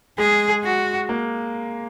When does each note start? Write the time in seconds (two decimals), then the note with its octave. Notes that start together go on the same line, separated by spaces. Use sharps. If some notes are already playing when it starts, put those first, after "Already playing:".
0.18 G#3 G#4
0.64 F#4
1.09 A#3